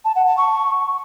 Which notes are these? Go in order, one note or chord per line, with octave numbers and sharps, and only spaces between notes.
A5
F#5
A5
C#6